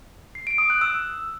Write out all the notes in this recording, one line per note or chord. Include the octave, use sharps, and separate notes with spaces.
C7
D7
D#6
F#6
E6